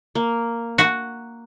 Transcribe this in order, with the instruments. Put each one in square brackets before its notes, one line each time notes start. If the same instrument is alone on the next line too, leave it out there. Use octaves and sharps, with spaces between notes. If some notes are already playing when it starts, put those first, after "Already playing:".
[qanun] A#3
[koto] F#4